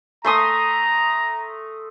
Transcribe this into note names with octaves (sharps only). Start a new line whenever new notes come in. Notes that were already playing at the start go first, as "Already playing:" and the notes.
A3 A#5 C6 D#6